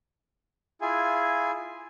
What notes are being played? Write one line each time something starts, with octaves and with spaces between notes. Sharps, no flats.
E4 F4 G#4 G#5